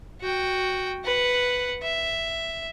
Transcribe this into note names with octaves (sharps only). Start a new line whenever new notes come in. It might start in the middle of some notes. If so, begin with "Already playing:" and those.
F#4 G5
B4 F#5
E5